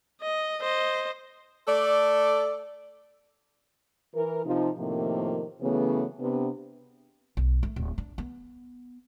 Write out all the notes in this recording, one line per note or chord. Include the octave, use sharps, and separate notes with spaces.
D#5
C5 D#5
A3 A4 D5
E3 A#4
C3 F3 D#4
A2 C3 D#3 F3 A3 A#3
C#3 E3 F#3 A3 B3
C3 B3 D4
B1
A3
D1
D4
B3